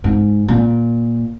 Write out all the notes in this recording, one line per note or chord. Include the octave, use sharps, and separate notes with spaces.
G#2
A#2